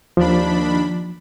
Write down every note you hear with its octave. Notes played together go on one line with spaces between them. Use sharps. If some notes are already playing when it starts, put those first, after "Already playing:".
D#2 F3 D4 B5